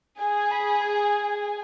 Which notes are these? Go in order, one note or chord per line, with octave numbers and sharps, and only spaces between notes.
G#4 G#5
B5
G#5